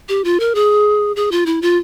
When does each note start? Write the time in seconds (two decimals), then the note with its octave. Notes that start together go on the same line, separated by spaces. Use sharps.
0.09 G4
0.24 F4
0.40 A#4
0.55 G#4
1.16 G#4
1.31 F4
1.46 E4
1.62 F4